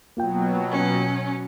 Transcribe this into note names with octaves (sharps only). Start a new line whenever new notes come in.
B2 F#3 A#3 F4 G5
C#4